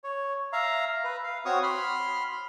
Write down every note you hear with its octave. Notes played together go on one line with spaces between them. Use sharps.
C#5
E5 F5 A#5
B4
F5
C4 F#4 C#5 C#6 D#6
B5 C6 F6